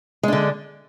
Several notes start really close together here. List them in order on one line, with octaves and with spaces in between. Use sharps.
G#3 D4 D3